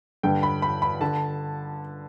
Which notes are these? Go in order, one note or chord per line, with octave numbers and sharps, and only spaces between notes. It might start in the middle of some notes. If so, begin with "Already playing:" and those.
G2 D3 G5
B5
B5
B5
D3 A5